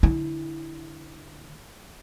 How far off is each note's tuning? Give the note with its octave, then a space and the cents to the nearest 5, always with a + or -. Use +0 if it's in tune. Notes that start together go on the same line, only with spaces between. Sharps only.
D3 +0 E4 -15